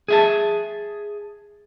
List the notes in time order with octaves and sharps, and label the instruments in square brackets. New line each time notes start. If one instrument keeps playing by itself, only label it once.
[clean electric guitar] G#4 E5 A5